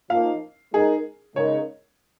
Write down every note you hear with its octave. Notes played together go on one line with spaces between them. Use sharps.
F3 A#3 D#4 F5
G#3 D#4 G#4 A#4
C#3 G#3 D#4 A#4 C#5